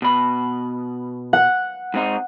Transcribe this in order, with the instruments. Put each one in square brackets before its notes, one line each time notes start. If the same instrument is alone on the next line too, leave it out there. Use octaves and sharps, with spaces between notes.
[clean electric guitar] B2 B5
[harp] F#5
[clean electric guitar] G#2 C4 D#4